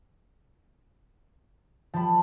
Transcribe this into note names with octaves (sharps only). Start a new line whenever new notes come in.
F3 G3 A5 B5